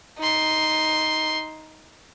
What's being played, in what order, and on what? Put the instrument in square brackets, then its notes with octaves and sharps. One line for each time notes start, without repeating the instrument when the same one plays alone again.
[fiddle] D#4 C6